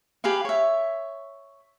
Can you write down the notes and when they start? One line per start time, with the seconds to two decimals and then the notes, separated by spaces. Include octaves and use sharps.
0.24 G4 G#4 B4 F5
0.45 C#5 E5